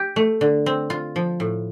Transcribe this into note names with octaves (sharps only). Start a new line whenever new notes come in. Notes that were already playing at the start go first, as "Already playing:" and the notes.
Already playing: G4
A3
D3
C4
F4
F3
A2